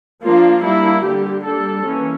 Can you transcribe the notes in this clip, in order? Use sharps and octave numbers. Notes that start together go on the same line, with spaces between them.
F3 A#3 D4 F4
G3 A#3 D4 E4
D3 G3 A#3 G4
G3 A#3 D4 A4
E3 A#3 C#4